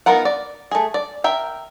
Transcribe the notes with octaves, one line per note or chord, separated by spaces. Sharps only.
B3 D#4 F4 A#4 F#5
D5
A3 G#4
D5
A#4 E5 G5